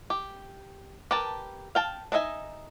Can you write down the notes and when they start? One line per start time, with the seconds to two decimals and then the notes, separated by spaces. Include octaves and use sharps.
0.10 G4
1.11 G4 A#4 B4 A5
1.75 F5 G5 A5
2.12 D4 D#4 D#5 E5 G#5